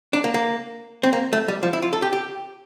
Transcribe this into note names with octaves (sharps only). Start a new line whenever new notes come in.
D4
A#3
A#3
C4
A#3
A3
G3
F3
E4
F4
A4
G4
G4